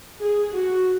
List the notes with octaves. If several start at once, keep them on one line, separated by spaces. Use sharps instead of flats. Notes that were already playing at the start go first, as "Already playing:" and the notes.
G#4
F#4